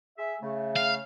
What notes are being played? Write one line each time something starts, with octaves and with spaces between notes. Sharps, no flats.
G#4 E5
C#3 A3
F5